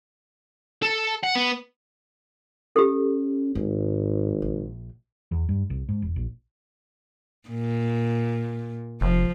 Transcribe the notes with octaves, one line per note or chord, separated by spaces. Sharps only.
A4
F#5
B3
C#4 G4 A4
G#1 G#2
A#1
E2
G2
C2
G#2
E1
A#1
A#2
F1 F3